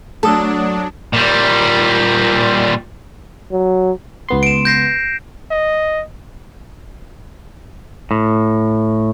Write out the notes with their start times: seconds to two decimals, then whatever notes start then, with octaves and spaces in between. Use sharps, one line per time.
0.23 F#3 A3 D4 A4 A5 D#6
1.13 A#2 G3
3.52 F#3
4.29 C#2 B3 C6
4.43 D7 E7
4.65 G6 A#6 C7
5.51 D#5
8.11 A2